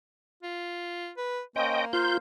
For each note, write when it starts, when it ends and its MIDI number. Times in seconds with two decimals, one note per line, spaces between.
0.43 1.11 65
1.17 1.41 71
1.56 2.19 58
1.56 1.85 61
1.56 1.85 72
1.56 1.85 75
1.56 1.85 79
1.93 2.17 65
1.93 2.17 70
1.93 2.17 72
1.93 2.17 77
1.93 2.17 91